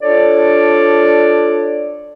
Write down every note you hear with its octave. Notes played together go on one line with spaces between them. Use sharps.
D4 F4 A4 C#5 D5